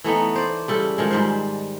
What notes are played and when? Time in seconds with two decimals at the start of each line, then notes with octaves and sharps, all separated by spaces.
0.04 E3 A3 B3 D#4
0.36 C5 D5
0.68 C#3 G3 A4
0.98 D#3 F3 G#3
1.11 G#2 G3 C5